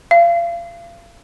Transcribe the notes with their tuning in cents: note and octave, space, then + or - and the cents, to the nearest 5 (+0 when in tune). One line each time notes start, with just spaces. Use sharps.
F5 -35